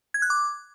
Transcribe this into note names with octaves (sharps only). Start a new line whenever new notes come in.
G#6
F#6
D6